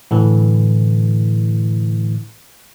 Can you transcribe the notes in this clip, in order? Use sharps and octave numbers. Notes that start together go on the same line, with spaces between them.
A2 D3 E3